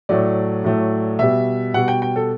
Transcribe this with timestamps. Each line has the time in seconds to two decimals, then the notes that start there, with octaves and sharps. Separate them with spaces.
0.09 A2 F#3 A3 D5
0.64 A2 F#3 A3
1.19 B2 G3 E5
1.74 B2 G3 F#5
1.88 G5
2.02 G5
2.16 A4